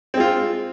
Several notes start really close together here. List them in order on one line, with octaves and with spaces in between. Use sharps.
C4 G#3 F4